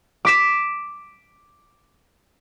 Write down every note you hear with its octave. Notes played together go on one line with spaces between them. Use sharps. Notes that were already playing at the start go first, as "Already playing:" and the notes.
D6 B6 E7